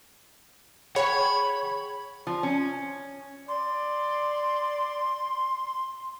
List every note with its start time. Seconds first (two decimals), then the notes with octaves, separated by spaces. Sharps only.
0.96 G#4 C#5 F#5 G5 B5
2.27 F3
2.43 C#4
3.48 D5 C6